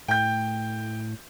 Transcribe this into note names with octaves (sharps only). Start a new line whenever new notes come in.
A2 G5 G6